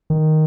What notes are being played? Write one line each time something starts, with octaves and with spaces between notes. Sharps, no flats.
D#3